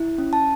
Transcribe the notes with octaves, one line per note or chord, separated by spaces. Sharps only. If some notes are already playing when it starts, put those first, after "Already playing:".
Already playing: E4
C#4
A5